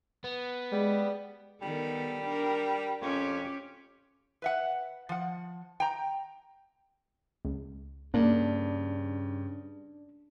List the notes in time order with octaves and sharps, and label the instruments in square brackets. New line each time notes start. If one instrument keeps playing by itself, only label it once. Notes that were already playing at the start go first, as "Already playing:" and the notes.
[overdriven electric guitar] B3
[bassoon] G3 [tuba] G#3
[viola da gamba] D#3 B3 A4 [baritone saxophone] G3
[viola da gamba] D4 A#4
[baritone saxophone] F2 [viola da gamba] C#4 G4
[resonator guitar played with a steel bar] B4 E5 F#5
F3 F#5
G5 A#5
[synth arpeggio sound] C#2
[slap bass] G2 [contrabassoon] C#3 [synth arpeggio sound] A#3 [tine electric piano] D4